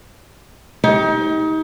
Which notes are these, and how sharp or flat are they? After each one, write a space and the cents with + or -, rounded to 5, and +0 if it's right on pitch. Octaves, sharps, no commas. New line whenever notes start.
D#4 +30 G4 +0